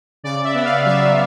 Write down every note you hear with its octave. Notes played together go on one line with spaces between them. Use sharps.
C#3 D5
E5
B3
F5
F#3 E5